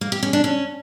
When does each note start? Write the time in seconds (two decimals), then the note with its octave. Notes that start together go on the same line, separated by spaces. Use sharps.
0.01 A#3
0.12 G4
0.23 C#4
0.33 D4
0.44 C#4